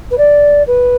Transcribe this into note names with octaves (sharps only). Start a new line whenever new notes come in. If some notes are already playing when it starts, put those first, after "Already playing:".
B4
D5
B4